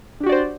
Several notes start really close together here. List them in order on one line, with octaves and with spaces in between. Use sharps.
D4 G4 F#4 D5 C5